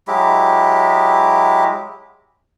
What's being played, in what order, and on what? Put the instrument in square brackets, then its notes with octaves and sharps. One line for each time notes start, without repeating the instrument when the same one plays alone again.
[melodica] F#3 G#3 E4 G4